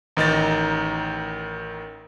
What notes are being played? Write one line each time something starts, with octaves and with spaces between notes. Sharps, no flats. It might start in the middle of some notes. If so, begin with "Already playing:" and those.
A1 D#3 D#4 A6